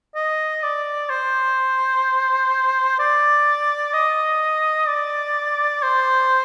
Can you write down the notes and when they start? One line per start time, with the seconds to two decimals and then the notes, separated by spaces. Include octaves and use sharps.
0.15 D#5
0.63 D5
1.10 C5
2.99 D5
3.94 D#5
4.88 D5
5.83 C5